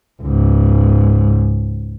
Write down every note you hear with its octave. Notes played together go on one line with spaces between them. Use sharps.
C#2 G#2